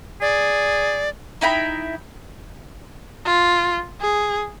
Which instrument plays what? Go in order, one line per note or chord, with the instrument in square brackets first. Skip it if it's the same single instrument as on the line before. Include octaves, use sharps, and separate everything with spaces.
[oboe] G#4 [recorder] D5
[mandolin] D#4 E4 G5 B5
[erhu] F4
G#4